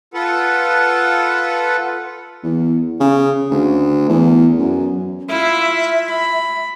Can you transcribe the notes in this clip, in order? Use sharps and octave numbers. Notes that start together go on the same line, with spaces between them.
F4 A4 B4 F#5
E2
C#3
D2
E2
F#2
E4 F4 E5
B5